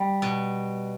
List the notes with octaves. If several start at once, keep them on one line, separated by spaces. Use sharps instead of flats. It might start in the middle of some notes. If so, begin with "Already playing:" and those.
Already playing: G3
B2